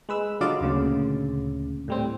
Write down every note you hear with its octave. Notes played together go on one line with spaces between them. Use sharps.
G#3 B4 E6
D3 F#3 F4 D5 D#5 D6
D2 A#2 C#3
A2 G3 C4